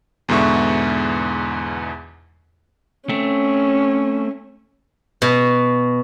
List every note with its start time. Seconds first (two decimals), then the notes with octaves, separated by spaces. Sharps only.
0.28 E2 G#2 B2 D3 E5 C#6
3.09 A3 C4 C#4
5.22 B2